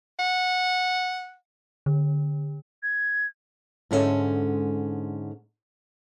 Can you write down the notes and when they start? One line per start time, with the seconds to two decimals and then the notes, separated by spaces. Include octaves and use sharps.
0.19 F#5
1.86 D3
2.83 G#6
3.91 G#2 D3 G#3 C#4 A4 E5